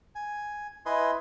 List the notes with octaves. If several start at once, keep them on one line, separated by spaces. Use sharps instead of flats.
G#5
E4 B4 D#5 G#5 C6